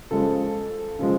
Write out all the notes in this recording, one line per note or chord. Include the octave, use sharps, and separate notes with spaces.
C#3 F3 G#3 A4
C#3 F3 G#3